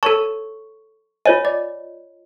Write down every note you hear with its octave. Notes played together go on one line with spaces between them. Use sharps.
A4 C#5 A5 C#6
F4 C#5 D#5 G#5
D5